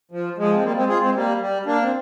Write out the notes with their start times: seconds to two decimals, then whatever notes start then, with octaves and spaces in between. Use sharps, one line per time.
0.11 F3
0.38 F3 G#3
0.54 C4
0.63 G3 A#3
0.76 G#3 C4
0.89 F4 G#4
1.01 G#3 C4
1.15 G3 A#3
1.40 G3
1.66 A#3 D4
1.82 C4